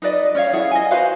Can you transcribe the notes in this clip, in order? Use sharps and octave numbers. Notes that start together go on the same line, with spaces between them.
D#4 B4 D5 D#5
C#4 C#5 F5
E4 G#4 F#5
D#5 G#5
F#4 B4 C5 F5